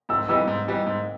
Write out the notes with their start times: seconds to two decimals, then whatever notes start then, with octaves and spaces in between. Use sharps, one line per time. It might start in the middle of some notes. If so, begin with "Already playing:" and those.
0.09 G#2 E6
0.28 E3 G3 B3 D#4 E6
0.47 G#2
0.68 E3 G3 B3 D#4
0.86 G#2